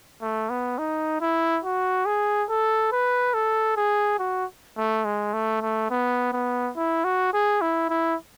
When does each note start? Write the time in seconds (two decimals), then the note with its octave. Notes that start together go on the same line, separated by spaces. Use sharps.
0.22 A3
0.50 B3
0.78 D#4
1.21 E4
1.64 F#4
2.06 G#4
2.49 A4
2.92 B4
3.34 A4
3.76 G#4
4.19 F#4
4.77 A3
5.05 G#3
5.33 A3
5.62 A3
5.90 B3
6.33 B3
6.76 E4
7.04 F#4
7.33 G#4
7.61 E4
7.89 E4